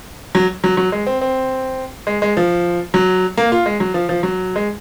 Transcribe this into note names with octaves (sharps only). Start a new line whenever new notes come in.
F#3
F#3
F#3
G#3
C4
C4
G#3
G#3
F3
F#3
A#3
F4
G#3
F#3
F3
F3
F#3
G#3